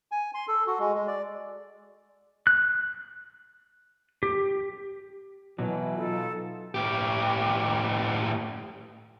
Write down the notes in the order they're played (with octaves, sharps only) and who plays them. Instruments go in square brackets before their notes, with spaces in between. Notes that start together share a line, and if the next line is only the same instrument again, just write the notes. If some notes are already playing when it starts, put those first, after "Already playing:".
[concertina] G#5
C6
A4
F#4
G#3
G#3
D5
[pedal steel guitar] F#6
G4
[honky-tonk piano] B2 [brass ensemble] E3 [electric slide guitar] F#3
[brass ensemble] D#4 F4 [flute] A4
[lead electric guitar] A2 G4